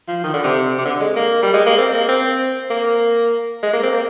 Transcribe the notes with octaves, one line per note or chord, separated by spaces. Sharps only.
F3
D#3
D3
C3
C3
D3
G#3
A#3
G3
G#3
A#3
C4
A#3
C4
A#3
G#3
A#3
C4
A#3